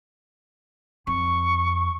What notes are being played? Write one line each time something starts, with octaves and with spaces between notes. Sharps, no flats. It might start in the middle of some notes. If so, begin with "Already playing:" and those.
F2 C#6